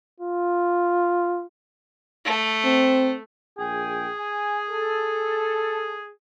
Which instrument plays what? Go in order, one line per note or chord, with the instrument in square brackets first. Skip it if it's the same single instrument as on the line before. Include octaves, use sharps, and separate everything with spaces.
[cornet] F4
[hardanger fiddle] A3
[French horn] C4
[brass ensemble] A#1 G5 G#5 [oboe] G#4
[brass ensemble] G#5
A4